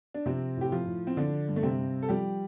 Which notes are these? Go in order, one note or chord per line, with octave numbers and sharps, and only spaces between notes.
D4
C3 F3 C4
A2 G4
F3 F4
A2
C4
D3 F3 D4
G2
A3
C3 C4
G2
A4
F3 G3 G4